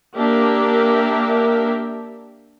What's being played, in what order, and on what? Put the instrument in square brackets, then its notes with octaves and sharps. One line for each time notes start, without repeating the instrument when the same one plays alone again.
[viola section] A#3 D4 G4 A#4 E5